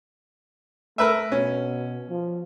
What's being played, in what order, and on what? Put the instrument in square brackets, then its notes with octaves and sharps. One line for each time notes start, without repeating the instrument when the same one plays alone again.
[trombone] A3 [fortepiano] A#4 B4 E5
[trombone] B2 [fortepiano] C#4
[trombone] F3